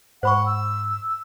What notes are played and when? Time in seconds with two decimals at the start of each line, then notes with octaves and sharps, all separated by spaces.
0.23 G#2 C5 F#5 B5 C#6
0.46 E6